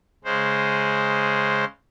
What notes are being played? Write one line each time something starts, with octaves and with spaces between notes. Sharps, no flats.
C#3 G#3 C5